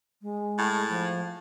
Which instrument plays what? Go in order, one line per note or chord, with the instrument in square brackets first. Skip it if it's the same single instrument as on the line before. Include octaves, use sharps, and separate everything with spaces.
[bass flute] G#3
[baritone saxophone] A2
[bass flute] F3